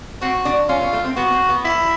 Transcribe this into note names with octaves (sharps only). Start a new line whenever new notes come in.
C4 F#4
D4
C#4 F4
B3
A3
C4
B3 F#4
C4
B3
E4